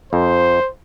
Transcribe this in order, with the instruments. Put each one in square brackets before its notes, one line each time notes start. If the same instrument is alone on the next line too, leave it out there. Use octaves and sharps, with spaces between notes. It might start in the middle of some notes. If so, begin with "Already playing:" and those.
[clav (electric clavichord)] F2 [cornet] C5